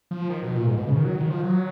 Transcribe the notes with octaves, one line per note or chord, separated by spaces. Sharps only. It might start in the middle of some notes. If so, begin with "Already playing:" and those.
F3
D#3
B2
A#2
G#2
B2
C#3
D#3
F#3
D#3
F3
F#3